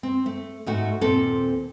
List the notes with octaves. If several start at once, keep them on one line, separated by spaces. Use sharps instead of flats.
C4
A3
G#2 A3 F#4
D#2 A#2 C4 A4